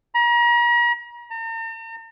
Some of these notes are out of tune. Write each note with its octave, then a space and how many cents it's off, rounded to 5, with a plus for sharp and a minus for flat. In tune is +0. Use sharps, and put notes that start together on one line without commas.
A#5 +40
A#5 -45